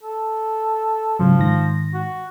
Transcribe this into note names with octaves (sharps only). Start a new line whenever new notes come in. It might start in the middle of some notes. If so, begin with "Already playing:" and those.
A4
G#2 C#3 F3 F#3
G#2 D#3 A#6
F#4